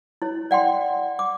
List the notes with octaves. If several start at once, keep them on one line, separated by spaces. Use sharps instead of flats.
E4 C#5
D5 F#5 G5 C6
D6